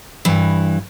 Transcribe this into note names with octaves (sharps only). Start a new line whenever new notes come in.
G2 E3